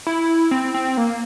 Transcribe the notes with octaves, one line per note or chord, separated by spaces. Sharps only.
E4
C4
C4
A#3